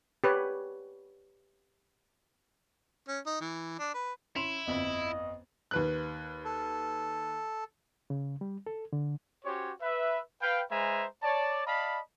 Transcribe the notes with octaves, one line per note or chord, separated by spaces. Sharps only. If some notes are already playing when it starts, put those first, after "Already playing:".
G4 B4 C#5
C#4
D#4
E3
D4
B4
C#4 E4 C6 F7
G1 F2 D#5 F#7
D#2 B4 F#6
A4
C#3
G3
A4
D3
C#4 F#4 G4 C5 C#5
B4 E5
B4 F5 G5
G#3 B4 C5 E5 G#5 A#5
C#5 D5 A5
D5 D#5 F5 A5 B5